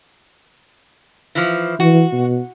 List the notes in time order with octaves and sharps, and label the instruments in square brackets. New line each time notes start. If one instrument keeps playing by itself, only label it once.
[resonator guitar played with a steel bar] E3 F3
[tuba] E3 [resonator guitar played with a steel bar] F#4
[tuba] B2